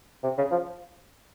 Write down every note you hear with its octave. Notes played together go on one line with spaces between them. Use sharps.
C3
C#3
F3